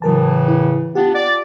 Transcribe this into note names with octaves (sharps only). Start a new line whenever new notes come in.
A2 C#3 E3 F#3 A#4 A5
E4
B3 D4 F4 G4
D5